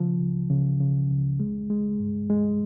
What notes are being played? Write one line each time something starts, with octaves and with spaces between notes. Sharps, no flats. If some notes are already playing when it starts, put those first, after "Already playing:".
Already playing: C#3 F3
C#2
C#3
C#3
C#2
G#3
G#3
G2
G#3